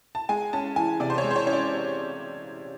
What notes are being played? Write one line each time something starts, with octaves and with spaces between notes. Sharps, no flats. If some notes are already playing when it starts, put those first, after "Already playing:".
A5
G#3 G#5
C#4 A5
E3 G#5
C3 D5
C5
C#5
G#3
C5
C#5
C#4 C#5
D5